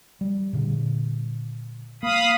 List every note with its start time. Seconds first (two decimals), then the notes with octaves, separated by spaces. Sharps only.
0.21 G3
0.53 A#2 D3
2.03 A#3 F5 B5 D#6